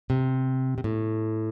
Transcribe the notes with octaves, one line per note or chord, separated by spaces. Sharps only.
C3
C3
A2